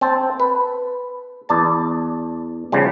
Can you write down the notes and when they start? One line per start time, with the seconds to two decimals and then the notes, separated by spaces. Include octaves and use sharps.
0.01 C4 C5 A5
0.40 B4
1.49 E2 D5 A5
2.72 C#3 F3 G3